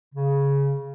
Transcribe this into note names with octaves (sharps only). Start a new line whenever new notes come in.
C#3